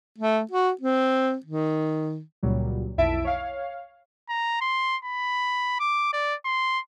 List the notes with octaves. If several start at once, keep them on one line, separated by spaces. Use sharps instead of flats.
A3
F#4
C4
D#3
C#2 A#2 F#3 G3
B1 F2 E4 E5 A5 D7
C#5 F5
A#5
C6
B5
D6
D5
C6